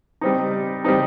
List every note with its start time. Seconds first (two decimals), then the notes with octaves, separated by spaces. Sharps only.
0.21 G3 C4 D#4
0.85 G3 C4 D#4